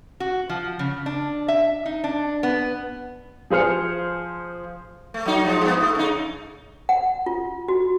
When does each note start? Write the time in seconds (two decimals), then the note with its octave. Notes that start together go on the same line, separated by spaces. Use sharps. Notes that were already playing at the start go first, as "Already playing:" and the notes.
0.20 F#4
0.49 F3
0.79 C#3
1.06 D4
1.48 E5
1.85 D#4
2.04 D4
2.43 B3
3.50 F3 G#4 C5 F6 C#7
5.14 A3
5.26 F#3 D#4
5.45 F3 G#3
5.61 G2 B3
5.80 A3
5.95 C#3 D#4
6.89 F#5
7.26 F4
7.68 F#4